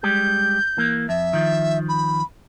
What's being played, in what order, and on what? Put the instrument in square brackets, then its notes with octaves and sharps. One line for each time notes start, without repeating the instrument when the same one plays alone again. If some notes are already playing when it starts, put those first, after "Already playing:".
[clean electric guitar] G3 G#3 G4 [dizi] G6
[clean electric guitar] E3 A#3
[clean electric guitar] F2 [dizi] E5
[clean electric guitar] D#3 F3
[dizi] B5